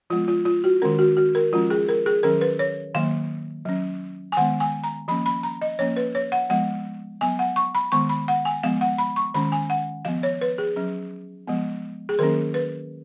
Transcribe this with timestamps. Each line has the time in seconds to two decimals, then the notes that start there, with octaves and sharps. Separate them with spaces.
0.10 F3 G#3 B3 F4
0.28 F4
0.45 F4
0.64 F#4
0.82 D#3 G#3 C#4 A#4
0.99 F#4
1.17 F#4
1.35 A#4
1.52 F3 G#3 C#4 F4
1.70 G#4
1.89 A#4
2.06 G#4
2.23 D#3 F#3 C#4 A#4
2.41 B4
2.59 C#5
2.95 D#3 F#3 A#3 F5
3.65 F#3 C#4
4.32 G#5
4.37 D#3 G#3 B3 F#5
4.60 G#5
4.84 A#5
5.08 F3 A#3 C#4 B5
5.26 B5
5.43 A#5
5.61 D#5
5.79 F3 A#3 C#4 C#5
5.96 B4
6.15 C#5
6.32 F#5
6.50 F3 G#3 B3 F#5
7.21 F#3 B3 G#5
7.39 F#5
7.56 C#6
7.75 B5
7.92 D#3 G#3 B3 C#6
8.09 B5
8.28 F#5
8.45 G#5
8.63 F3 G#3 B3 F5
8.81 F#5
8.98 B5
9.16 C#6
9.34 D#3 G#3 C#4 B5
9.52 G#5
9.70 F#5
10.05 F3 B3 F5
10.23 C#5
10.41 B4
10.58 G#4
10.76 F#3 C#4
11.47 F3 G#3 B3
12.09 G#4
12.19 D#3 F#3 A#3 C#4 A#4
12.54 B4